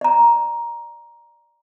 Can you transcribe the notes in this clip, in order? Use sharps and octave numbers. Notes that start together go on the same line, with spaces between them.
D5 A#5